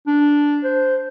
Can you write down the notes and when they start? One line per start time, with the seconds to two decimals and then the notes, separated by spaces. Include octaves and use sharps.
0.07 D4
0.64 C5